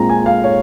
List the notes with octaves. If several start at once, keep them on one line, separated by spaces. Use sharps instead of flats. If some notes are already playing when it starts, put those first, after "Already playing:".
Already playing: A#2 G#3 C4 F4 A#5
G#5
F5
C#5